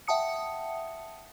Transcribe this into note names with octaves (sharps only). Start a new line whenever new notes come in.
E5 F#5 G5 A5 D#6 C#7